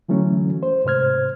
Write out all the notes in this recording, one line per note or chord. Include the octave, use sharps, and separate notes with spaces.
D3 E3 F#3 A3 C#4
C5
G#2 C3 C5 F6 G#6